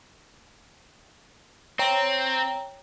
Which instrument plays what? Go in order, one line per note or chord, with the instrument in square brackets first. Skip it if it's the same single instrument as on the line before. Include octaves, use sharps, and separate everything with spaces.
[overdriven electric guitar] C4 [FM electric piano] C#5 G5 A#5